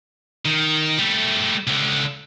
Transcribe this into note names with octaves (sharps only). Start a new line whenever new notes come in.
D#3
G3 A3
C#2 D3